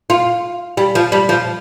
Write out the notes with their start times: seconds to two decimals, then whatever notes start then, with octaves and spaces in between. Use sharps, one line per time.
0.10 F4
0.77 G3
0.95 F3
1.12 G3
1.29 F3